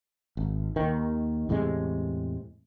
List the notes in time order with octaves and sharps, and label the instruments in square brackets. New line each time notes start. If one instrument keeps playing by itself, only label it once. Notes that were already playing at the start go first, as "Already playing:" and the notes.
[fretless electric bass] G#1
D#2 D#3
E2 A2 C3 G#3